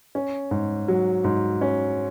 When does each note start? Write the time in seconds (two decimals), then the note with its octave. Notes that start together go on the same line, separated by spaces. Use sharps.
0.15 C#4
0.51 G#2
0.88 F#3
1.24 G#2
1.61 C#4